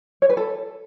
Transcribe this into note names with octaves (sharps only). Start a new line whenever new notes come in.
C#5
B4
A4